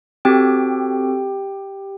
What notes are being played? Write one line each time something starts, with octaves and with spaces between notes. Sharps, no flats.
C4 F#4 G4 A4 G5